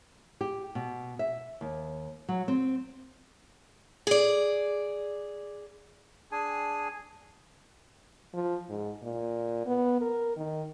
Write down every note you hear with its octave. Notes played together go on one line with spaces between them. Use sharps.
G4
B2
E5
D#2
F#3
C4
G#4 D5
D4 G#4 G#5
F3
G#2
A#2
B3
A#4
D#3